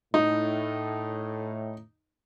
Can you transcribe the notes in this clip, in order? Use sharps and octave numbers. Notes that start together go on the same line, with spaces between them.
A2 D#4